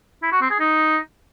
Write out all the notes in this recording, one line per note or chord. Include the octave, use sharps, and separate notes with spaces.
E4
F#4
C4
G#4
D#4